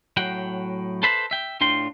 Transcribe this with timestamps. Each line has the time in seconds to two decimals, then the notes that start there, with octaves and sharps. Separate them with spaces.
0.17 A2 F#3 F#5 G5
1.03 A4 B4 C5 E5 A5 B5
1.31 E5 G5
1.61 A2 D4 F4 G5 C6